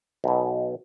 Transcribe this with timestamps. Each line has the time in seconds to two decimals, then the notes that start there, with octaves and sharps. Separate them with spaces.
0.24 B1 B2